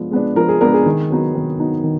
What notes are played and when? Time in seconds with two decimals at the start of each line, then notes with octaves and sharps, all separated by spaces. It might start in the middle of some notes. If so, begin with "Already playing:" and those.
Already playing: F3 G#3 B3 D4
0.11 G#3 B3 D4
0.36 F3 A#4
0.48 G#4
0.61 G#3 B3 D4 A#4
0.74 G#4
0.86 D#3
1.10 F#3 B3 D#4
1.35 D#3
1.59 F#3 B3 D#4
1.84 D#3